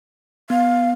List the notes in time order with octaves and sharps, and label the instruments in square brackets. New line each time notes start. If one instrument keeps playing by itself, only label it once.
[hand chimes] B3 [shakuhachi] F5